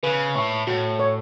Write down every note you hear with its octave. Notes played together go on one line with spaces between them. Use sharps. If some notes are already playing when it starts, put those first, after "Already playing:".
C#3 B4
A2 C#6
A2 F#4
C#5